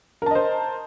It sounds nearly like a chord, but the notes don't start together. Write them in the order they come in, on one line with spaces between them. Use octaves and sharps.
A#4 A5 D#5 C5